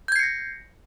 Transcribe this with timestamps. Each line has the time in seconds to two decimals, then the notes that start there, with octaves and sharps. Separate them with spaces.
0.08 G6
0.12 G#6
0.16 C7
0.19 C#7
0.23 A#6